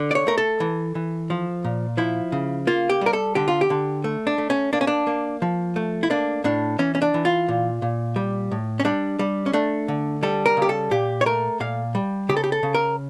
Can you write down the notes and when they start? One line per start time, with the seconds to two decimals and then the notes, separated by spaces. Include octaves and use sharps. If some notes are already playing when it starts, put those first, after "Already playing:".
Already playing: D3
0.11 D5
0.15 C#5
0.27 A3 A#4
0.38 A4
0.60 E3
0.95 E3
1.30 F3
1.64 A#2
1.97 F3 E4
2.32 C#3
2.67 A#3 F4
2.89 G4
3.01 G3 A#4
3.13 A4
3.35 D3 G4
3.48 F4
3.61 G4
3.70 D3
4.04 A3
4.27 D4
4.38 A3
4.50 C#4
4.73 A#3 D4
4.81 C#4
4.87 D4
5.07 A#3
5.42 F3
5.76 A3
6.03 E4
6.10 A#3 D4
6.44 A2 D4
6.79 E3 C#4
6.95 C#4
7.02 D4
7.14 E3
7.25 F4
7.48 A#2
7.82 A#2
8.16 G3
8.52 A2
8.80 C#4
8.85 G3 D4
9.19 G3
9.46 C#4
9.53 A3 D4
9.88 D3
10.23 G3 A4
10.46 A#4
10.57 C#3 G4
10.69 A4
10.91 A#2 G4
11.21 C#5
11.26 A3 A#4
11.60 A#2 F5
11.95 G3
12.29 C#3 G4
12.37 A4
12.44 G4
12.52 A4
12.63 C#3
12.74 A#4